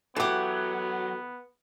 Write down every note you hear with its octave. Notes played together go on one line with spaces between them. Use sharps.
E3 F#3 B3 G4 A4 F#5